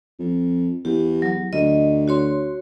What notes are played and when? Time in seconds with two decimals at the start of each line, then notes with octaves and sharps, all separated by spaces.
0.19 F2
0.85 E2 G4
1.22 F#3
1.53 D2 D#5
2.08 F#4 C#5 C6